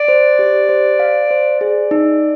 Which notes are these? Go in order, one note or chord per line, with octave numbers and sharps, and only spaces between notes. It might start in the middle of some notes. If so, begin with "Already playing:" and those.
Already playing: D5
C5
G4
C5
F5
C5
G#4 D5
D#4